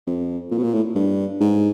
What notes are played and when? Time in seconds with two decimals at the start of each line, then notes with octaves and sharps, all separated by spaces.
0.07 F2
0.51 A#2
0.58 B2
0.63 A#2
0.74 A2
0.95 G2
1.41 G#2